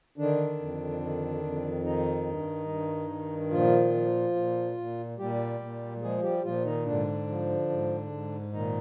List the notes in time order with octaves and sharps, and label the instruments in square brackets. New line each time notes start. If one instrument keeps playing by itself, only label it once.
[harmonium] D3 D#3 D4
F2
D#3
F2
D#3 D#4
G2
G2
D#3
A#2 F3 F4
F3
A#2
A#2
A#2 G3 G4
A#2
F3 G#3 G#4
G3 G4
A#2 F3 F4
D#3 D#4
G#2 D3 D4
F3
G#2
G#2
A#2 D#3 D#4